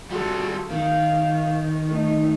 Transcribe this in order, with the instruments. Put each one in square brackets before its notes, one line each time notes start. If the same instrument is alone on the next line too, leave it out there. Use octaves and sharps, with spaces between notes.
[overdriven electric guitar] G3 F4 [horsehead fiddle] F#4 A4
[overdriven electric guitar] D#3 [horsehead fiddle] F5
[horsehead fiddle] A3 D#4